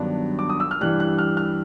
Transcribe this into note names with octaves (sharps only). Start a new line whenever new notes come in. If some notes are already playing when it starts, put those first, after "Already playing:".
Already playing: G2 D#3 F#3 B3 D4
D6
D#6
E6
F6
G2 E3 G3 F#6
F#6
F6
F6